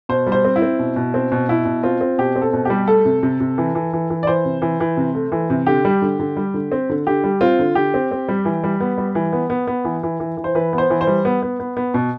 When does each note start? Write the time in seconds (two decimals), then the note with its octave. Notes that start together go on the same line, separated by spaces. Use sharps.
0.09 B2 C5
0.27 G3
0.32 C5
0.45 C4
0.56 E4
0.62 C4
0.79 B2
0.96 B2
1.14 C4
1.32 B2
1.49 B2 E4
1.65 B2
1.83 C4 F4
2.01 C4
2.18 B2 G4
2.36 C4
2.42 A4
2.53 B2
2.65 G3 G4
2.87 A3 A4
3.05 C3
3.23 C3
3.40 C3
3.58 E3
3.75 E3
3.93 E3
4.10 E3
4.23 D5
4.27 E3 C5
4.45 C3
4.62 E3
4.80 E3
4.97 C3
5.15 A3
5.32 E3
5.50 C3
5.67 D3 G4
5.85 G3
6.02 D3
6.19 D3
6.37 G3
6.54 D3
6.72 C4
6.89 D3
7.07 D3 G4
7.24 G3
7.41 C4 F4
7.59 D3
7.75 D3 G4
7.94 C4
8.11 C4
8.28 G3
8.45 E3
8.64 G3
8.80 B3
8.98 G3
9.15 E3
9.33 B3
9.50 B3
9.67 B3
9.85 E3
10.03 E3
10.20 E3
10.37 E3
10.44 C5
10.55 E3 B4
10.73 B3
10.78 C5
10.90 E3
11.01 C5
11.07 G3
11.25 B3
11.42 B3
11.60 B3
11.77 B3
11.94 B2